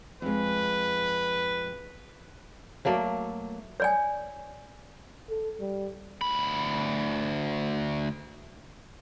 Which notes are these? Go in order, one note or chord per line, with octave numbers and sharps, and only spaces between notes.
F2 G#3 B4
F#3 A3 A#3 D5
C#5 D5 G#5
A4
G3
D2 B5